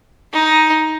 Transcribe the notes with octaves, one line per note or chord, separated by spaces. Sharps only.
D#4